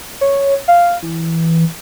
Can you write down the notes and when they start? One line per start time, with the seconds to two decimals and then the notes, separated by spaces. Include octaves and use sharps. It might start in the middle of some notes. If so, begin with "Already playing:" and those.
0.21 C#5
0.68 F5
1.03 E3